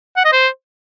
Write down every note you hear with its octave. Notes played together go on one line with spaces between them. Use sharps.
F#5
D#5
C5